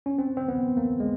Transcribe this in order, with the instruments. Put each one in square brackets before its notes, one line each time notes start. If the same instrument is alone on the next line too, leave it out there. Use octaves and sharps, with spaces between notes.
[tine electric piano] C#4
C4
C4
B3
A#3
G#3